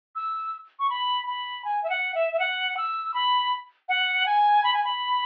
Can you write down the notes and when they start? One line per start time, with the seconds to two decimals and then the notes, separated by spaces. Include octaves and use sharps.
0.15 E6
0.79 C#6
0.90 B5
1.27 B5
1.65 G#5
1.83 E5
1.89 F#5
2.14 E5
2.33 E5
2.39 F#5
2.77 E6
3.14 B5
3.88 F#5
4.26 G#5
4.64 B5
4.73 G#5
4.84 B5